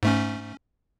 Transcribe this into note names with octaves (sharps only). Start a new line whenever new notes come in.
G#2 A3 C#4